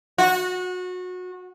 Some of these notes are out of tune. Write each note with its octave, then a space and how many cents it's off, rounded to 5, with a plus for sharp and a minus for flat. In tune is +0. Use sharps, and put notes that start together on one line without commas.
F#4 -25